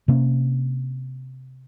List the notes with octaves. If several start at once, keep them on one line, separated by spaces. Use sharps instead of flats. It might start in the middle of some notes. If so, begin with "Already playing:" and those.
C3 A#3 C#4